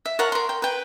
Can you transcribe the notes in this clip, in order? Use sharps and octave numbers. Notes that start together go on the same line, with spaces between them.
E5
A#4 C#5 F#5 A5
A#4 C6
G5
B4 G5